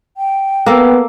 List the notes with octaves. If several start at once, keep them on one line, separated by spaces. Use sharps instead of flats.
G5
A#3 B3 A4